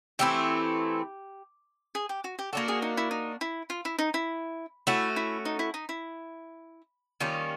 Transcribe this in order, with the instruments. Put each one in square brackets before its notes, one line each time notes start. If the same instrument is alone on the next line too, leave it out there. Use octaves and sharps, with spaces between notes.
[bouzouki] E3 A3 C4 E4 [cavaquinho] G4
[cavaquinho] G#4
G4
F#4
G4
[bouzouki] A#3 D4 F#4 [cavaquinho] A4
[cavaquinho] G#4
D#4
E4
D#4
E4
F4
E4
D#4
E4
[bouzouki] A3 C#4 F#4 [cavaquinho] E4
[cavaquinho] E4
D#4
E4
D#4
E4
[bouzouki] D#3 G3 A#3 C#4 [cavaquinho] F4